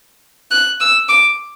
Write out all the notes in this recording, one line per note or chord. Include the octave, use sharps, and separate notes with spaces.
F#6
E6
D6